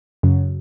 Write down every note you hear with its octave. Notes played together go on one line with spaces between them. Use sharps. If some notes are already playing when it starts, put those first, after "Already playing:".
F#2 C#3 F#3